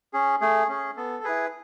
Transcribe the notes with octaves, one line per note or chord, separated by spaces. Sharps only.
C#4 G#4
A3 G#4
C#4 G#4
B3 A4
E4 G#4 B4